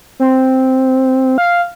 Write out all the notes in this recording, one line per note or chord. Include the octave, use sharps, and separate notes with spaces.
C4
F5